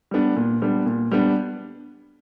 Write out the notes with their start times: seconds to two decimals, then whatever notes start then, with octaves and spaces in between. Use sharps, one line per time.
0.11 G3 B3 D4
0.36 A#2
0.62 G3 B3 D4
0.86 A#2
1.12 G3 B3 D4